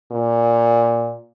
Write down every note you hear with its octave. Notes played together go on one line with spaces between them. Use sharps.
A#2